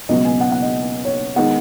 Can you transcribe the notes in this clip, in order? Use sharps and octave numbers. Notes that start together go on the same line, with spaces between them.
C#2 B2 F#3 B3 D#5
G#5
F#5
F#5
D#5
C#5
D#3 G#3 B3 F#5